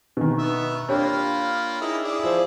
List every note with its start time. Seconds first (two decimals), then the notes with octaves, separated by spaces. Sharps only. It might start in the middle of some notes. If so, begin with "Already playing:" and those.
0.17 B2 D#3
0.38 B3 E5
0.89 A#3 D4 F4 G4 C#5 B5
1.81 D#4 E4 G#4
2.04 E4 G#4 D5
2.24 F3 C5